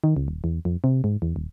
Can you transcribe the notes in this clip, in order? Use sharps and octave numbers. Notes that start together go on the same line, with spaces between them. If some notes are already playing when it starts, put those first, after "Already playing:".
D#3
C#2
D#1
E2
F2
C3
G#2
E2
D#1